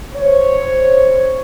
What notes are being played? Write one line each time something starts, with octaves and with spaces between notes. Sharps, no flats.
C5 C#5